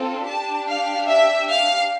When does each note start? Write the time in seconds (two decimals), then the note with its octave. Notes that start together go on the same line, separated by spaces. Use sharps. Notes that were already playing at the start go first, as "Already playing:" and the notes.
Already playing: C4 F4 A4
0.26 D4 G4 A5
0.68 F5
1.09 E5
1.50 F5